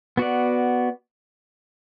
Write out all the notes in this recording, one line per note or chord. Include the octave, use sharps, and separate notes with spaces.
B3 F#4 D5